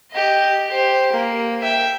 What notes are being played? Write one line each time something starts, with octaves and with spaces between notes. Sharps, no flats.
G4 D#5
G4 C5
A#3
E5 G5